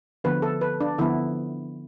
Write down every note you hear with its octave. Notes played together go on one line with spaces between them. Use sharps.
D3 F3 B3 B4
A4
B4
D4
D3 F3 B3 E4